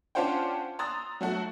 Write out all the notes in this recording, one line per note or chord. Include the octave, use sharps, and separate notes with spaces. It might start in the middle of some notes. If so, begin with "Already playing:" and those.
C#4 D4 F4 C5 F#5 G5
A#5 C6 D#6 E6 F#6 A6
F#3 A3 F#4